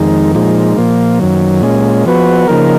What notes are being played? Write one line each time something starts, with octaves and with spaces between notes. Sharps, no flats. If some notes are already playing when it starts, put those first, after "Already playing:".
Already playing: F2 D#3 G#3 D#4
A#2 F3 G#3 D#4
A#2 F3 A#3
F#2 D#3 F#3
A#2 G#3 C#4
F3 B3 F#4 B4
C#3 F3 A#3 D#4 A#4